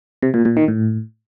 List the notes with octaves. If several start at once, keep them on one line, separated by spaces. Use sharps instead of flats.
C3
A#2
A#2
D#3
A2